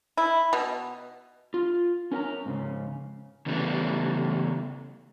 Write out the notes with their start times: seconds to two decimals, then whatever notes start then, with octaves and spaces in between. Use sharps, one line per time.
0.17 E4
0.53 B2
1.54 F4
2.12 C#4 A#4 G#5 A#5
2.46 G#2 C#3
3.46 C#3 E3 G3 A3 B3